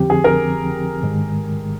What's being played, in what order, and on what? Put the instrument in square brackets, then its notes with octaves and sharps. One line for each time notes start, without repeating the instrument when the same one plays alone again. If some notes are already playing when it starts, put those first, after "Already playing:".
Already playing: [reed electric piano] F2 D3 F3 C4 [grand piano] G4
[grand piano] G#4
A#4
[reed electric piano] G#2 D#3 G#3